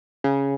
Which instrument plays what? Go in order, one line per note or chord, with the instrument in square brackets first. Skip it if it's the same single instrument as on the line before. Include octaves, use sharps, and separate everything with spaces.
[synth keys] C#3